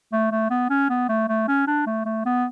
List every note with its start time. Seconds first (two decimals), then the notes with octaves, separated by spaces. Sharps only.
0.12 A3
0.32 A3
0.50 B3
0.70 C#4
0.89 B3
1.09 A3
1.29 A3
1.48 C#4
1.67 D4
1.86 A3
2.06 A3
2.25 B3